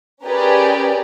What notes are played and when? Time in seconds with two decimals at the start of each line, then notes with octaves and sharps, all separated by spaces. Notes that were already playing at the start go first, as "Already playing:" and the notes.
0.23 C#4 G4 G#4 A#4 B4 D5